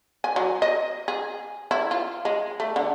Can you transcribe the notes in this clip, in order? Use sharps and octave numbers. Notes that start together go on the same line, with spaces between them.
G#5
F#3
D#5
G#4
E4
F4
G#3
A3
D3